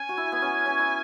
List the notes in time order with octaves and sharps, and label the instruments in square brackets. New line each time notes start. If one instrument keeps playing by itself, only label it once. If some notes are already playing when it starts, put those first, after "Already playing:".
Already playing: [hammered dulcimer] C#4 [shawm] G#5
[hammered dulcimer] F#4
E4
B3
C#4
C#4
E4